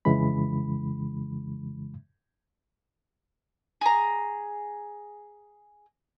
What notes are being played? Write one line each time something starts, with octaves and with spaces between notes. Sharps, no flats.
F2 C#3 E3 G#3 B5
G#4 A#5